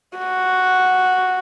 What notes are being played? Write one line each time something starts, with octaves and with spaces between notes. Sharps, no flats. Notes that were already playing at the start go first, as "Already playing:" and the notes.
F#4